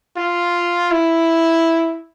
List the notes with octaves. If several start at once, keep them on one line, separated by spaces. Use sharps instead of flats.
F4
E4